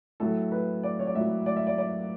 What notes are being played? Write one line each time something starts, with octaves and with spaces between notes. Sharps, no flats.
A2 F#3 A4
B4
D5
C#5
D5
A2 F#3 E5
D5
E5
D5
D5